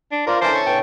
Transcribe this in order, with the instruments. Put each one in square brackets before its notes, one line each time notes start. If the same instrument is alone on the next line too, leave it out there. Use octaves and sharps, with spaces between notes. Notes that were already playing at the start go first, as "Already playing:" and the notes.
[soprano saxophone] D4
[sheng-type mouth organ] F4 C5 D5 [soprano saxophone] A#4
[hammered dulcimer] D3 E3 [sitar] C#4 [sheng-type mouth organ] A#4 A5 D6 [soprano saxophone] C5
[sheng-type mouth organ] A5 C#6
[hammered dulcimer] B2 [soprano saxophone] G5